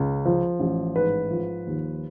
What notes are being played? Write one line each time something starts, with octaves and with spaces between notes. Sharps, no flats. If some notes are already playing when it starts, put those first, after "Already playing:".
Already playing: C#2
F3
A1
G#2 B4
F3
D#2